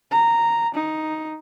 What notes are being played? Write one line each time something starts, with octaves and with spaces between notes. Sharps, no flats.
A#5
D#4